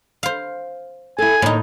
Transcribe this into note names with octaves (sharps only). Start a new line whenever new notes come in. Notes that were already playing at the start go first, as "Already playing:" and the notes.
C5 F5
E4 A4 G#5
A2 D3 A#3 D#4 C#5